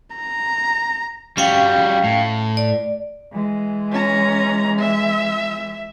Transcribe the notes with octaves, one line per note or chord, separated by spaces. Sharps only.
A#5
G3 C#4 F#4 F5 G5
A2
D5
E3 G#3
C#4 A#5
E5